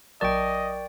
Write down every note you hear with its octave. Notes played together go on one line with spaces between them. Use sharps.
A#1 F#3 A#4 D5 D#5 G5 A5 C#6